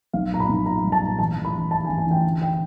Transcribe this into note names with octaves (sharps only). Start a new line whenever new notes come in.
B1 F5
A#2 A#5
B5
B1
A#2 A#5
G3
A5
A#2
A1 A5
A1
B5
A1
F3 A5
G#5
A1
G#5
A1 G5
D3
G5